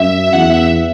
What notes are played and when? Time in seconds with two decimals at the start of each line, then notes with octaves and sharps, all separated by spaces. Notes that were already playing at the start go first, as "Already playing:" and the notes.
Already playing: F#2 E5
0.33 E2 F#5
0.50 E5